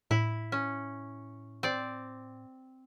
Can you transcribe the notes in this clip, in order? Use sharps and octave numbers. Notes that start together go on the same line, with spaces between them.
A2 E4
C#4
C4 D5